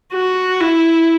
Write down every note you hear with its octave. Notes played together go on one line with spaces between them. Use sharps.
F#4
E4